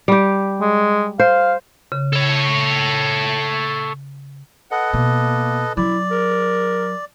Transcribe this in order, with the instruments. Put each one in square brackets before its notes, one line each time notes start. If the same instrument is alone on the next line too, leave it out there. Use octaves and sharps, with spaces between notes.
[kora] G3 G4
[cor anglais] G#3
[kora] C5 [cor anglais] F5
[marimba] C#3
[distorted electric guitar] A4 C#5
[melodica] A4 B4 D#5 [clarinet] F#5
[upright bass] B2 [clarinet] A#3
[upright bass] F#3 [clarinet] E4 [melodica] D5
[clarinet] A#4